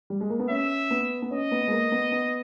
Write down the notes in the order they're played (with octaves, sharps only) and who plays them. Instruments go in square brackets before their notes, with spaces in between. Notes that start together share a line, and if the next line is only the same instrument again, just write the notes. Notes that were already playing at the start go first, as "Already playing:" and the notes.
[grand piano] G3
G#3
A#3
B3
[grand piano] C#4 [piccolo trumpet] E5
[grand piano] B3
B3
[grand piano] C#4 [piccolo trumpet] D#5
[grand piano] B3
G#3
A#3
B3
B3